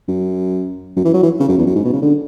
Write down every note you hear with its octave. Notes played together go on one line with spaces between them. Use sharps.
F#2
F#2
E3
F#3
E3
C#3
F#2
E2
F#2
G#2
B2
C#3
D3